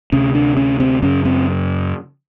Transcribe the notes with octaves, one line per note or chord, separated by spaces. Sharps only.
D2 C3 C#4
D4
C#4
C4
F#2 C#3 C#4
C4